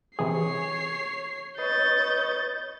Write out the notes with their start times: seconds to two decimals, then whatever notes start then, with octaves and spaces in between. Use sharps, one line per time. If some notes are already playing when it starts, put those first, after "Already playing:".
0.19 C3 E3 G#4 C#5 C7
1.58 B4 C#5 D#5 G6 A6